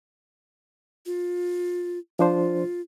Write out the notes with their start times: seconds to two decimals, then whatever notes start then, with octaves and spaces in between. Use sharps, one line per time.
1.06 F4
2.19 F3 D4 F4 C5